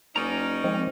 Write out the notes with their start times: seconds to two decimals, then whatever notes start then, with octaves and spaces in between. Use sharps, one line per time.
0.16 F#1 C#4 D#4 A#4 D5 A#5
0.64 G#1 F3 G#3 C4